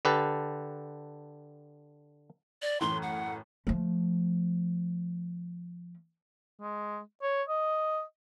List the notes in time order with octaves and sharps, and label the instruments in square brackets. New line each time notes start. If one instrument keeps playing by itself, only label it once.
[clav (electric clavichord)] D3 G4 A4 B4
[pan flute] D5
[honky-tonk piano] F#2 A2 E3 [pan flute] C6
[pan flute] F#5
[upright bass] F3 A3
[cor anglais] G#3
C#5
D#5